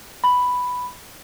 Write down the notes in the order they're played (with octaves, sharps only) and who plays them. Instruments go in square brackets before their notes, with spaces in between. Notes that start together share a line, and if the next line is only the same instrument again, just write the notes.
[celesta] B5